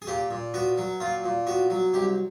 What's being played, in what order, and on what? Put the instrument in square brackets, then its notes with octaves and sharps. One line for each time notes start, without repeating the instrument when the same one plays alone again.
[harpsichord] G#4
A#2 G4
A#2
B3 F#4
F#3
A#2 F4
A#2
B3 F#4
F#3
C2 G4